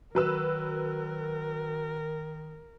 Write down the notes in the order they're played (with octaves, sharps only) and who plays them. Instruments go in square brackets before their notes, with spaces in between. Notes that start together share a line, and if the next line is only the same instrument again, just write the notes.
[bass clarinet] D#3 [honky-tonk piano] F#3 B4 E6 [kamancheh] A#4